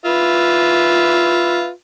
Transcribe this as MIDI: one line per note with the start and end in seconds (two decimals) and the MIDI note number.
0.05 1.69 65
0.05 1.69 71
0.05 1.69 76